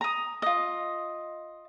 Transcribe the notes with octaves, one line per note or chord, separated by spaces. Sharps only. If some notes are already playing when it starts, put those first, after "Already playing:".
A#5 D#6
F4 D#5